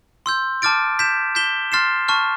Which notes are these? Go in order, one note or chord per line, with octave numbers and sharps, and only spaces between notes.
C6 E6 G6
A5 D6 F6 A6 D7
G6 B6 E7
G6 B6 E7 G7
C6 F6 A6 C7 E7
A5 C#6 F6